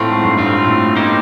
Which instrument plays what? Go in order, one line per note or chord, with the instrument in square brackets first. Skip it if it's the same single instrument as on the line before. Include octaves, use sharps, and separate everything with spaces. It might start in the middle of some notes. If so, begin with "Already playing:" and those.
Already playing: [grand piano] A2 [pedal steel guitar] A3 C4 F4
[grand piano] G#2
G2
[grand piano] G2 [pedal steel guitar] A3 C4 F4
[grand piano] A2
[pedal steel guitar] A#3 D#4 G4 C5